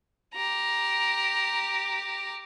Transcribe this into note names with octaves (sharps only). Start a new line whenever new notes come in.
G4 A#5